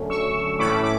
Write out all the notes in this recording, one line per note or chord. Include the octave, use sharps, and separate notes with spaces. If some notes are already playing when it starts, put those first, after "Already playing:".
Already playing: D3 F#3 A3 C#4
C#6 E6
A2 E3 A3 C#4 B5 D6
D6